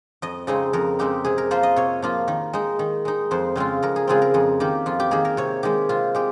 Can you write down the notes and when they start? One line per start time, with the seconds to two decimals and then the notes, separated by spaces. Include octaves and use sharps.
0.22 F2 D#5
0.47 C#3 G#3 C4 D#4 D#5
0.73 F2 A#4
0.99 C#3 G#3 C4 D#4 G4
1.25 C3 G#4
1.38 A#4
1.51 F3 A#3 F4 C5
1.63 D#5
1.76 C3 C#5
2.02 F3 A#3 F4
2.28 D#3
2.53 G#3 D#4
2.79 D#3
3.05 G#3 D#4
3.31 F2 C5
3.56 C#3 G#3 C4 F4
3.83 F2 A#4
3.96 G#4
4.07 C#3 G#3 C4 F4 G#4
4.22 A#4
4.34 F2 G#4
4.60 D#3 A#3 G4
4.86 F2 F4
5.00 G4
5.11 D#3 A#3 G#4
5.25 A#4
5.37 C3 C#5
5.63 D#3 G#3 G4
5.89 C3 F4
6.14 G#3 G4